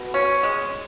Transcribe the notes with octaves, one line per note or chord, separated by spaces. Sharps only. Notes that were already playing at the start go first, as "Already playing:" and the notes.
Already playing: B2
C#4
G#3